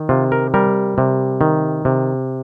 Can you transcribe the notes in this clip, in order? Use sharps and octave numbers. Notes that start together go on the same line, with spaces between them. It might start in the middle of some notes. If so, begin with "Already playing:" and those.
Already playing: D#3
C3 F4
A#4
G3 A#4
C3
D#3
C3